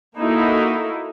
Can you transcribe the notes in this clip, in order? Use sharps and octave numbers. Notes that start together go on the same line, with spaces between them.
A#3 D#4 E4 F#4 A4